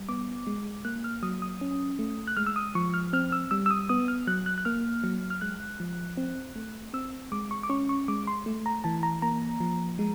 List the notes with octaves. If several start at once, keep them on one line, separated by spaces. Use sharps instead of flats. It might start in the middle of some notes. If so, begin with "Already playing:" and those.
Already playing: G3
B3 D6
G#3
A#3 F#6
F6
F#3 D#6
D#6
C#4
A3
F#6
G#3 F6
E6
D#6
F3 C#6
F6
C4 F6
E6
G3 E6
E6
D#6
B3 D#6
F6
F#3 F#6
F#6
F#6
A#3 F6
F#3
F6
G#3 F#6
F3
C4
A3
C4 E6
G#3 D6
C#6
D6
C#4 C#6
C#6
G#3 D6
C6
A3
A#5
E3 A5
A#5
A#3 A#5
F3
G#3